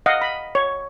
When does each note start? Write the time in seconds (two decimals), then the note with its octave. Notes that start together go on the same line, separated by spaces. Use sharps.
0.06 D#5 F5 F#5
0.21 B5
0.55 C#5